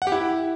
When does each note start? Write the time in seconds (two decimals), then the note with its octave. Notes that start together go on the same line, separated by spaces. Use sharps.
0.02 F#5
0.07 G4
0.12 E4